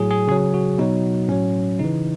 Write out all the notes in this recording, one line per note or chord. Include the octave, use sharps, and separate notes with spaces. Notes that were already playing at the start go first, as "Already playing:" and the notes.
Already playing: A2 F#3 G#4
G#4
C#3 F#3 G#4
F#4
B2 F#3 D#4
A2 F#3 C#4
C#3 D#4
E3